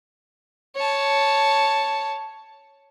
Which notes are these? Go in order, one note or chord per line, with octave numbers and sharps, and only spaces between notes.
C#5 A5